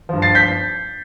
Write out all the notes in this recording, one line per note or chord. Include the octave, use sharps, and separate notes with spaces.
G2 F3
A6 C7
G6 B6